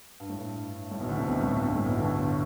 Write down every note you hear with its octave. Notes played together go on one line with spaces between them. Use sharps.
G2
A2
G2
A2
B1 B2
D2 D3
C2 C3
B1 B2
A2
G2
G2
A2
B1 B2
D2 D3